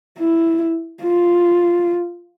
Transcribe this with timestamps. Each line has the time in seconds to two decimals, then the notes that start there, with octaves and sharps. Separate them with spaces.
0.19 E4
1.03 F4